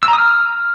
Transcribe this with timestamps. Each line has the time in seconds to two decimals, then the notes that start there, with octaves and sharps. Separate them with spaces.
0.03 E6
0.08 A#5
0.13 D#6
0.18 F6